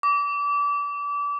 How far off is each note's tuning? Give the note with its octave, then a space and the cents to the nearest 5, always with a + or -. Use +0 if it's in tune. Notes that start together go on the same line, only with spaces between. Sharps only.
D6 -30